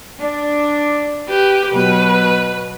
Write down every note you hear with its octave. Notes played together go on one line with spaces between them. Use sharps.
D4
G4 B4
B2 F#3 B4